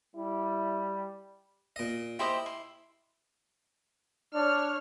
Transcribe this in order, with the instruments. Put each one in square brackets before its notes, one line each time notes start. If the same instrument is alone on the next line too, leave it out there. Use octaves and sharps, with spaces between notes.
[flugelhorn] G3 [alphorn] E4
[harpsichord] A#2 D#5
[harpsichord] E4 [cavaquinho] G4 C5 D#5
[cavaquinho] C6
[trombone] D4 [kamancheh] C#5 F6